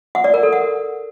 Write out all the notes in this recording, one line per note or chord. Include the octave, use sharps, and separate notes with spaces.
F#5
D5
A#4
A4
F#5